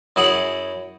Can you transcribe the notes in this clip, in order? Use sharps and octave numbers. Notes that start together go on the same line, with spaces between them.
F#2 E4 G#4 F#5